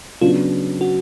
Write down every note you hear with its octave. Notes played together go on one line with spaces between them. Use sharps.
C#3 F#3 B3 D4 F4
F#4